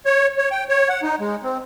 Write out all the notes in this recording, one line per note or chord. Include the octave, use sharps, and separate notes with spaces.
C#5
C#5
G5
C#5
F#5
D#4
G#3
C4